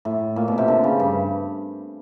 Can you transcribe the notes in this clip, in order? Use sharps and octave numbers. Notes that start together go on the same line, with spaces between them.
A2
A#2
B2
C3
D3
C#3
G2